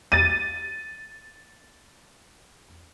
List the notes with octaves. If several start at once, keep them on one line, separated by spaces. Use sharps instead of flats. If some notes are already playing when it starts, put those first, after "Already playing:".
A6 D#7